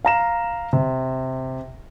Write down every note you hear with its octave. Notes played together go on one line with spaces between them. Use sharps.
F5 A#5 E7
C3